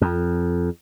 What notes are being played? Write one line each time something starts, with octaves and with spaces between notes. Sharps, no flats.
F2